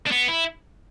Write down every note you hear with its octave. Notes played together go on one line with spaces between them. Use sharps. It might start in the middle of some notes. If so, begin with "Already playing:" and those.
D4
B3
E4